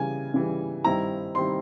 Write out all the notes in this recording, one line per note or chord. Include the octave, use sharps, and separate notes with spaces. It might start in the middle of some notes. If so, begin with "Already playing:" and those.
Already playing: C#3 E3 G3 G#5
C#3 E3 G3
G2 D#3 G3 C4 E4 A#5
D#3 G3 C4 E4 C6